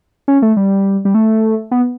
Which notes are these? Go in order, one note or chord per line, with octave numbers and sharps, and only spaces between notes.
C#4
A3
G3
G3
A3
B3